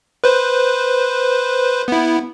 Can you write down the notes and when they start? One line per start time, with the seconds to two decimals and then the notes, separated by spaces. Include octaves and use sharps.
0.24 B4 C5
1.88 B3 E4